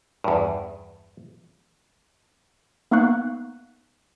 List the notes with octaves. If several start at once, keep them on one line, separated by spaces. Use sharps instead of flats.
E2 G2
A#3 B3 D#4 F5 C#6 F#6